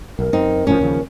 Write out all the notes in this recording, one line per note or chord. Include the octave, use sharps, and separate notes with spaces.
B1 A#4
F#2 C4 D#4
D#1 A2 F3 C#4
D#2 C#3 F3